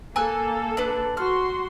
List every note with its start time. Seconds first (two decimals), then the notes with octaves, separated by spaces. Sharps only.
0.16 A#3 A4 G#5 E6 F#6
0.77 D4 B4
1.17 F#4 C6 F6